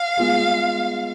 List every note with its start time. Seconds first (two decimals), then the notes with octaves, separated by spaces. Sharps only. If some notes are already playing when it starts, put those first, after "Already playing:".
Already playing: F5
0.17 G#3 B3 F4 G#4